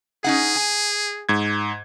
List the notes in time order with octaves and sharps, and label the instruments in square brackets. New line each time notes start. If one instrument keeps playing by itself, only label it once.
[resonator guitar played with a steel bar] C#4 D#4 F#5 [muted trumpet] G#4
[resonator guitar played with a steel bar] G#5
[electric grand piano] G#2 G#6